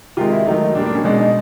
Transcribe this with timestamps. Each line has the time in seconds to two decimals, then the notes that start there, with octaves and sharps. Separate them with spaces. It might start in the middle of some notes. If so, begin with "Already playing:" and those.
0.17 C3 D#3 G#3 F4
0.32 E4
0.46 D#3 F#3 A3 D#4
0.75 A#2 G3 A#3 D4
0.85 D4
0.95 C#4
1.04 B2 G#3 D4
1.19 D#4